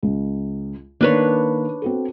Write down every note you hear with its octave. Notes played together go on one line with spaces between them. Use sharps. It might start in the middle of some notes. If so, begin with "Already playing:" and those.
C#2
D#3 A#3 D4 B4 C#5
C4 F#4 A4